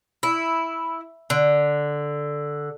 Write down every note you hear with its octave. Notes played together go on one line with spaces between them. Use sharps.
E4
D3